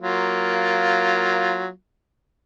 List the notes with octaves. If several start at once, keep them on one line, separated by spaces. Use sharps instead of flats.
F#3 A#3 F4